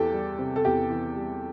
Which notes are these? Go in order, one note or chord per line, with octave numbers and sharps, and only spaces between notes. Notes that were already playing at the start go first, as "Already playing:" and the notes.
Already playing: E2 E3 G4 A4
G3
C3
A4
E2 G4
E3
G3